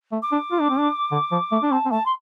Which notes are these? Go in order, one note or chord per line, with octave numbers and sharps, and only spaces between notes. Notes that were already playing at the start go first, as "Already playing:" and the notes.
A3
D6
D4
F4
D4
C4
D4
D3
F3
A3
D4
C4 A5
C4
A3 A5
C6